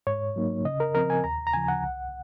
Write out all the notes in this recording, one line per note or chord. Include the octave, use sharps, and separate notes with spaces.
G#2 C#5
F#3 A#3 D#4
C#3 D#5
A#4
F3 C4 A#4
G#5
D#2 A#5
A#5
C#3 F3 G#5
F#5
C2